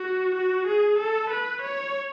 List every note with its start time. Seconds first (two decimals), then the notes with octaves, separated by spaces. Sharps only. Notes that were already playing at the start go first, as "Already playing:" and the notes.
Already playing: F#4
0.36 F#4
0.67 G#4
0.99 A4
1.30 B4
1.62 C#5